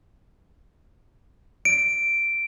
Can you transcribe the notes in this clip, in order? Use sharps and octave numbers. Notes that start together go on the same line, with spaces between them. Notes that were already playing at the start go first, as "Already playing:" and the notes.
D7